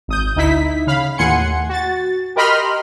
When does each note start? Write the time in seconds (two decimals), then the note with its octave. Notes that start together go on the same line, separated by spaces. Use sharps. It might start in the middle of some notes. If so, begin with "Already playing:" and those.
0.08 G#1 D#6 G6
0.36 D2 D#4 E4 B6
0.87 C#3 F5 B5
1.18 D#2 A2 F#5 G#5 C6 C#7
1.69 F#4 A6
2.36 G4 A#4 D#5 B5 C6 F6